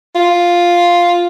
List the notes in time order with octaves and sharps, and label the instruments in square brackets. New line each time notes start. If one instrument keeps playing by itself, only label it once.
[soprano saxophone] F4